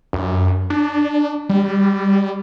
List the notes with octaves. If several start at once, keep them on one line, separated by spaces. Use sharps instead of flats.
F#2
D4
G3